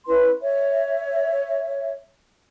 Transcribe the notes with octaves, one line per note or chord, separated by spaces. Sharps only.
C#4 E4 B4 C6
C#5 E5